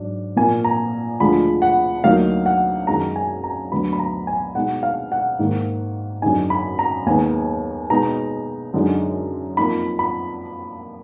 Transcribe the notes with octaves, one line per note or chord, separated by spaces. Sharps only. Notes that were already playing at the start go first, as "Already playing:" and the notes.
Already playing: G#2 F#3 D4
A#2 F3 A#3 G#5
A#5
D2 D3 F3 G#3 B5
F#5
D2 D3 F#3 A#3 D#4 F5
F#5
F#2 D#3 G#3 D#4 A#5
G#5
A#5
D2 D3 F#3 B3 B5
B5
A#5
G#5
B2 G#3 D#4 F#5
F5
F#5
G#2 D#3 A#3 D#4
F#2 D3 G#3 D#4 G#5
B5
A#5
D#2 D#3 G#3 B3 D#4 G#5
B2 G#3 B3 D#4 A#5
F#2 D3 G#3 D#4
F2 F3 A#3 D#4 B5
B5